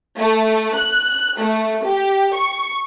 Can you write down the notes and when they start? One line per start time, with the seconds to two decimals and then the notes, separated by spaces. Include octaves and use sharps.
0.18 A3
0.76 F#6
1.38 A3
1.85 G4
2.37 C#6